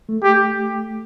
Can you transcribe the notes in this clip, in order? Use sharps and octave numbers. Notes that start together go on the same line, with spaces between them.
A3
G4